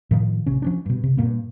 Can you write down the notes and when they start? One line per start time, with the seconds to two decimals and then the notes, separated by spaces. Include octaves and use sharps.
0.11 A2 D#3 F3
0.46 A1 C3 C#4
0.62 F3 C#4 D4
0.86 G2 B2
1.04 C3
1.17 G2 A#2 A#3 B3